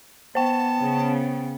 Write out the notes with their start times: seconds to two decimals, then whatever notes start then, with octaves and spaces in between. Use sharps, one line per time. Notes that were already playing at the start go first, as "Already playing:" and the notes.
0.35 B3 C5 G5 A5
0.81 C#3